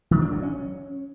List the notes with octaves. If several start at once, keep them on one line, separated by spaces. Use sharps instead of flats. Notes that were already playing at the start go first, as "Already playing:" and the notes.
D#3
D4
F#3
C#4